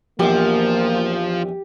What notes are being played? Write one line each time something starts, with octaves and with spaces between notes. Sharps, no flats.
A#1 E2 F3 A#3 G4 D6